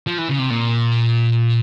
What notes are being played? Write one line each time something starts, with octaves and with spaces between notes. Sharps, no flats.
F3
E3
C#3
C3
A#2